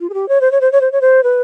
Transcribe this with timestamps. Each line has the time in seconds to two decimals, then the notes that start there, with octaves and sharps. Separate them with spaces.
0.01 F4
0.10 G#4
0.14 G4
0.29 C#5
0.41 C5
0.52 C#5
0.61 C5
0.72 C#5
0.81 C5
0.92 C#5
1.01 C5
1.23 B4